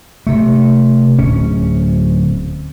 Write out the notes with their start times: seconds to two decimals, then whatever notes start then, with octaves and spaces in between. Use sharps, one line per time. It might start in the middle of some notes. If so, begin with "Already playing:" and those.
0.27 C3 A3
1.19 D1 C#4